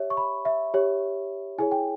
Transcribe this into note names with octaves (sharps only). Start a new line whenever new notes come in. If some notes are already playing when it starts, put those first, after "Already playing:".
Already playing: G4 C#5 E5
C#6
B5
E5
G4 C#5
E4 G#4 C#5 G#5
G5